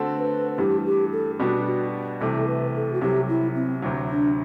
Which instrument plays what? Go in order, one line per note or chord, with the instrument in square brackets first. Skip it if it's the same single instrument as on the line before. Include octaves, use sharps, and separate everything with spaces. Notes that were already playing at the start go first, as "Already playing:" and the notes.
Already playing: [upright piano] D3 A3 C4 F#4 A4
[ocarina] B4
[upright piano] G2 E3 A3 [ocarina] G4
[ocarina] G4
A4
[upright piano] B2 G3 B3 D4 [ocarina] F#4
[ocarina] F#4
[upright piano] C2 C3 E3 A3 [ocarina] A4
[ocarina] A4
B4
A4
F#4
[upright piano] C2 C3 F#3 [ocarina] G4
[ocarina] E4
C4
[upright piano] D2 C3 F#3
[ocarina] D4